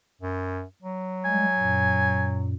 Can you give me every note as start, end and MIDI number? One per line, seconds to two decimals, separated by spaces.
0.21 0.63 42
0.82 2.51 54
1.25 1.45 55
1.25 1.45 56
1.25 2.36 80
1.58 2.54 42
1.58 2.54 46